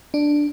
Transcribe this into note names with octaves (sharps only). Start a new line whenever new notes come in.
D4